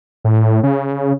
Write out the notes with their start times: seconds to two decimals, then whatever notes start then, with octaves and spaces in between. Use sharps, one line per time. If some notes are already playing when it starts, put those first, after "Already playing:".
0.24 A2
0.63 C#3